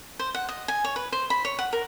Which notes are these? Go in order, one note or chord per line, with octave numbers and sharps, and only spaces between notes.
C5
F#5
D#5
G#5
C#5
B4
C5
B5
C#5
F#5
A#4